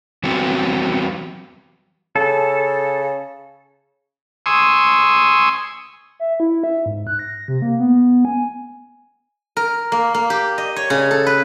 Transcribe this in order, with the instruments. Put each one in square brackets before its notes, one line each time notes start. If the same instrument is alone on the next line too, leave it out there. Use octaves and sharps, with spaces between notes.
[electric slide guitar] E3 F#3 G3 B3 C4 F#4
[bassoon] C#3 [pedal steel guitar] A4
[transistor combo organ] G#5 C6 C#6 D#6 E6
[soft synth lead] E5
E4
E5
G#2
F#6
A#6
C3
A#3
B3
G#5
[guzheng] A#4
A#3
A#3
G4
D#5
C#5
C#3
A4
B4